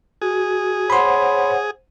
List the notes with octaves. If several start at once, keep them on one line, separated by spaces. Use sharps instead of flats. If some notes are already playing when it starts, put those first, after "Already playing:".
F#4 G#4
C5 C#5 F#5 B5 C6